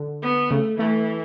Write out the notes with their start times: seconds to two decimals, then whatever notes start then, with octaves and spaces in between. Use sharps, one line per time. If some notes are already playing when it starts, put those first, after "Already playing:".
Already playing: D3
0.23 B3
0.50 C#3 A3
0.79 E3 A3